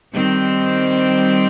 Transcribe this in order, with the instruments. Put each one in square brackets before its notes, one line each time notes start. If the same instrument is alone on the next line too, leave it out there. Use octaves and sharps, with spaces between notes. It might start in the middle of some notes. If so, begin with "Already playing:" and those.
[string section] D#3 G3 C4